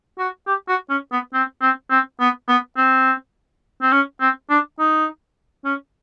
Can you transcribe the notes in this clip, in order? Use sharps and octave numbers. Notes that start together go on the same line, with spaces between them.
F#4
G4
F#4
C#4
B3
C4
C4
C4
B3
B3
C4
C4
C#4
C4
D4
D#4
C#4